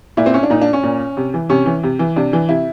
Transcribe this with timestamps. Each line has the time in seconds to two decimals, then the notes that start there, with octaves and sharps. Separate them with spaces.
0.17 A#2 E4
0.26 C4
0.34 C#4
0.43 D4
0.50 A#2 D#4
0.61 D4
0.73 C#4
0.83 A#2
1.17 C3
1.34 E3
1.49 C3 C#4
1.66 E3
1.83 C3
1.99 E3
2.16 C3 D4
2.33 E3
2.49 C3 E4